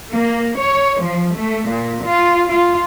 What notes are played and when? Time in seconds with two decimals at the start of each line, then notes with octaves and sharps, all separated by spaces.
0.13 A#3
0.58 C#5
1.02 F3
1.35 A3
1.68 A#2
2.04 F4
2.50 F4